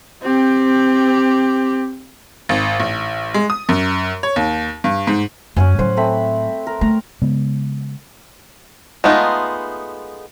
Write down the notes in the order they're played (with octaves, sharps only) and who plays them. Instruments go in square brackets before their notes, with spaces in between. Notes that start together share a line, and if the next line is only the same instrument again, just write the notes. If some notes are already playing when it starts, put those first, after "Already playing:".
[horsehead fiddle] C4 G4
[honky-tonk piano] G#1
A1
G#3
D#6
F#2
C#5
D#2
G2
G#2
[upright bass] F#2 [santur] C#4 F#5 G#5
[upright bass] A2 F#3 [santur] C5 F#5
[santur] A3 C4 B5
A#4
[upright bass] A3 [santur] A#5
[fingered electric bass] C#3 G#3 B3
[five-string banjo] G#3 A3 B3 D#4 F4